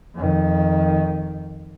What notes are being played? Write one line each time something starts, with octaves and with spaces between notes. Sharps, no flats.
F2 D#3